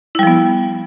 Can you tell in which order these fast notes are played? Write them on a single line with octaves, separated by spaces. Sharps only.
E4 G3 F3 B3